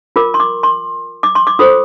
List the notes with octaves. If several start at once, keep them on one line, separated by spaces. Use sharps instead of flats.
F4 A#4 D6
C6
D6
C6
D6
C6
D6
F4 A4 C5 D#6